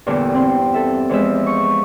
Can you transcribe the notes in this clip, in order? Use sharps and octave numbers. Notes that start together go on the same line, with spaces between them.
E2 G2 A#2 D3
C4 C6
A4 E5
E2 F3 G#3 E5
C#6